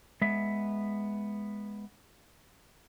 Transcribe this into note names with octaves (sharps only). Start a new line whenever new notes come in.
G#3 B3 E5